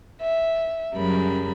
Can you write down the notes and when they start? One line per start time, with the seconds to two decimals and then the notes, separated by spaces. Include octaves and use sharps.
0.20 E5
0.95 F#2 C#3 F#3 G3 A#4 B5